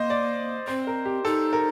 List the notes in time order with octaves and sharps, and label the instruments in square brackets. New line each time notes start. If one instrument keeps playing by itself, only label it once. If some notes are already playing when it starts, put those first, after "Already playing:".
Already playing: [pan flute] A#3 [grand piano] C5 D#5
[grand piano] D5
[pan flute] C4 [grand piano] C5
[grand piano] A#4
G4
[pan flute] D#4 [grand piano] A4
[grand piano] A#4